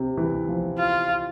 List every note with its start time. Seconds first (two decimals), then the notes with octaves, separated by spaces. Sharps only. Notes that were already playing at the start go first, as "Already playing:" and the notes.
Already playing: C3
0.17 E3
0.48 F3
0.79 F4